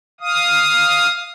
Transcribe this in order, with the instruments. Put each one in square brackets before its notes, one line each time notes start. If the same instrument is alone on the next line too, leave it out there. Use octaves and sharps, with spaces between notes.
[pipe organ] F5 D#6